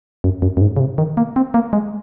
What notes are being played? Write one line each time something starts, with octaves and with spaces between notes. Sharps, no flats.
F#2
F#2
F#2
G#2
C#3
C3
D#3
A#3
C4
A#3
G#3